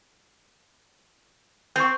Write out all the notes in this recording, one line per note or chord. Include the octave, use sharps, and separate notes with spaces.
C4 C#6 G6